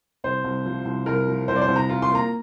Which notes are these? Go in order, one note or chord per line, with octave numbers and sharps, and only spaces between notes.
C2 C5
C2
F3
C2
C2 A#4
F3
C2 C5
D5
C5
C2
A#5
F4
C6
A#3 A#5